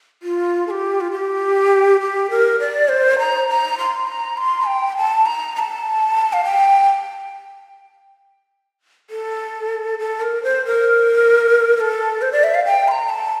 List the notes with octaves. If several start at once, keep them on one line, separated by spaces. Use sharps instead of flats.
F4
A4
G4
F4
G4
G4
A#4
D5
C5
A#5
A#5
C6
A#5
C6
G5
A5
A#5
A#5
A5
F5
G5
A4
A4
A#4
C5
A#4
A#4
A4
C5
D5
E5
F5
G5
C6
A#5
A5